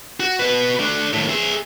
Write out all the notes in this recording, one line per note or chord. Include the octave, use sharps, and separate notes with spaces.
F#4
B2 B4
A3 D4
D#2 A2
G#4 E5